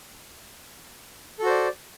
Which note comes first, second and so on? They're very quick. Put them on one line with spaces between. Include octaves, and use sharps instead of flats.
A4 F#4 C5 D5